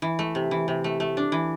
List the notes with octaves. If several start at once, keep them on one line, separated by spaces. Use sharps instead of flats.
E3
A3
C3
E3
C3
A3
A3
D4
E3